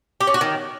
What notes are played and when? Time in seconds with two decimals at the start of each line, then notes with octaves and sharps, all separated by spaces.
0.20 G4
0.27 C#4
0.34 F#4
0.41 D#3